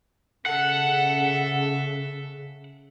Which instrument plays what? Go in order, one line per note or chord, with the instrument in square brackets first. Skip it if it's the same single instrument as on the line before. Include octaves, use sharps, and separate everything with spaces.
[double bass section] C#3 [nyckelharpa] A4 E5 [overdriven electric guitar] F#5